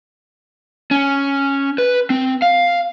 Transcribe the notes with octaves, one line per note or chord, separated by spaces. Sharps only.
C#4
B4
C4
F5